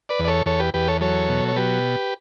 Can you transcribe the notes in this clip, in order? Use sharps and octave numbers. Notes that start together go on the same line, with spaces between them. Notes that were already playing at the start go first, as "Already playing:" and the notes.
B4 D5
E2
D5
A4 C#5
E2 A4 C#5
G4 B4
E2 G4 B4
A4 C#5
F#3 A4 C#5
B2
C#5
F#3 G4 B4